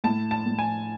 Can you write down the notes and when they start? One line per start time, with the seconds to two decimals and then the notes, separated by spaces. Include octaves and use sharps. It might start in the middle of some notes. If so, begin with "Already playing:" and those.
0.04 A2 A5
0.31 A5
0.46 A2
0.59 G#5